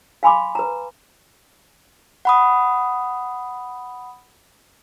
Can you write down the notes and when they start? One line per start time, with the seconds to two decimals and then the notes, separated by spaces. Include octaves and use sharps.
0.23 F5 G#5 B5 C6 D6
0.55 B4 A#5
2.25 F#5 B5 D#6